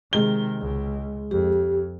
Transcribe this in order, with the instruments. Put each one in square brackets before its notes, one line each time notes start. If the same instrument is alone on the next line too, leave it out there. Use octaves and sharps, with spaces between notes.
[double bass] C3 D#3 [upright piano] G#3 G7
[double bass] C#2
[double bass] F2 [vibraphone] G4